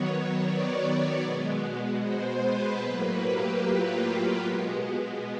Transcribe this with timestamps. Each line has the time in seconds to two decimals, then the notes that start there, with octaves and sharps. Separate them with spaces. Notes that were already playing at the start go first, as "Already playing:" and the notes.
Already playing: D#3 F#3 B3 C#5
0.40 D5
1.20 B2 G#3 B3
2.00 C5
2.40 B4
2.80 A2 F#3 A#3 B4
3.19 G4
3.59 F4
4.40 B2 G#3 B3